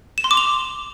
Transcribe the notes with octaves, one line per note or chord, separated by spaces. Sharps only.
E7
C6
D6
F7